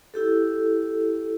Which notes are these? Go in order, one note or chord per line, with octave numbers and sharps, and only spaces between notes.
E4 G4 A4